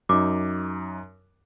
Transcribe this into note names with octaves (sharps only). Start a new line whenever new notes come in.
F#2 D#4 D6